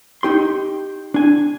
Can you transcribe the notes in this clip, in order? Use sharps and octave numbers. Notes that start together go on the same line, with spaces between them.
D#4 G4 C6
D4 G#5